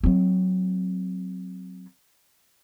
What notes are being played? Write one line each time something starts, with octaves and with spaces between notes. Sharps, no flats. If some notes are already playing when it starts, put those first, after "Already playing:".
F#3 C4